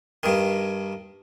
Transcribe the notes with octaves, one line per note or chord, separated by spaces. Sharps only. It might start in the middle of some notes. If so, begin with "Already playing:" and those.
G2 D#3